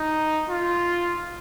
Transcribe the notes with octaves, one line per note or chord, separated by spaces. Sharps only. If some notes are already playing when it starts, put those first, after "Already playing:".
Already playing: D#4
F4